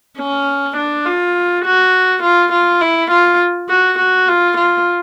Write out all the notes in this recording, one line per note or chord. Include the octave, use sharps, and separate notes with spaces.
C#4
D4
F4
F#4
F4
F4
E4
F4
F#4
F#4
F4
F4